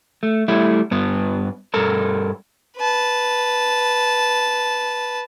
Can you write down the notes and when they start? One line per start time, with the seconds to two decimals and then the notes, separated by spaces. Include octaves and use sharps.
0.23 A3
0.48 G3 A3 E4
0.91 G2 B3
1.74 G2 A4 A#4 A#5
2.77 B4 A5